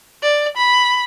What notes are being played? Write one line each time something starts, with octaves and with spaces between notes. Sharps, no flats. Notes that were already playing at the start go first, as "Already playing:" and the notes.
D5
B5